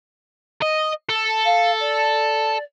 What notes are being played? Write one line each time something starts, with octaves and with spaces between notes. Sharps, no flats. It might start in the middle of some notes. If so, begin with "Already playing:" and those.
D#5
A4
F5
D5